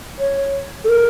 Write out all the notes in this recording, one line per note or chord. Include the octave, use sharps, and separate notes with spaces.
C#5
A4
A#4